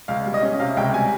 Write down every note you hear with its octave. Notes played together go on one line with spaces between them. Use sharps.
C#2 F5
G3
D#5
C#4
C3 F5
C#2 G5
G3 G#5